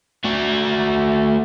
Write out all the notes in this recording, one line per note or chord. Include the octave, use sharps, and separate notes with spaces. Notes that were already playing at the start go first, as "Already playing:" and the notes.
A3 F#4